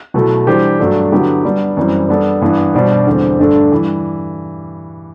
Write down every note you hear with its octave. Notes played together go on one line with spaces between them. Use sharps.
B2 F#3 A3 E4
E3 G3 D4 G4 C5
G2 F#3 A3 D4 A4
D3 F#3 B3 E4 G4
G3 B3 D4
F#2 E3 G3 C4
G3 B3 D4 A4
G2 E3 B3 D4
B2 G3 D4 F#4 C5
E2 D3 G3 C4
G2 D3 A3 D4 A4
E3 G3